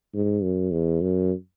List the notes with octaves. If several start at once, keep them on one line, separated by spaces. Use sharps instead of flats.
G#2
F#2
E2
F#2